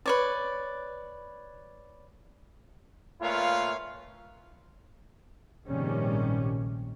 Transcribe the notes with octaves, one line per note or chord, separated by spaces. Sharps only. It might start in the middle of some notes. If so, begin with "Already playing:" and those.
B4 C#5 D5
A#2 A3 F4 B4 C#5 F5
A#1 G#2 C3 D#3 G3 C#4